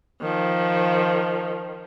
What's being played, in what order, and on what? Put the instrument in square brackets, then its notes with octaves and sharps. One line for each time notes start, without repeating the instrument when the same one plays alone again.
[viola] D#3 F3